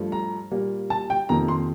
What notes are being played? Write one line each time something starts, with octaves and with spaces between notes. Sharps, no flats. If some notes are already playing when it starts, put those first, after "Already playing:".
Already playing: G2 F3 A3
A#5
A#2 G3 A#3
A5
G5
F2 C3 D#3 A#3 A#5
C6